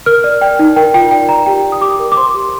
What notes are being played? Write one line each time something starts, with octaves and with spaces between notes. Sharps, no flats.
A#4 F6
D5
D5 G5
D#4
A#4 G5
F4 G5
D5 G5
D5 A#5
G4 G5
D5
D#6
G4 D6
A#4
D6
C5 C6
G4